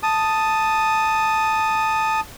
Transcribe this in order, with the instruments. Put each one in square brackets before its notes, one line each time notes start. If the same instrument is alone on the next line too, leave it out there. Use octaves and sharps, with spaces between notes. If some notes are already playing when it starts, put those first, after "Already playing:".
[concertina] A5 D#6